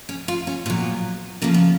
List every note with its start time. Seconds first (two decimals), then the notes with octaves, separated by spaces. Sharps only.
0.09 C#4
0.28 F4
0.47 C#4
0.66 A#2 F#3 B3
1.42 C#3 F3 A#3
1.54 B3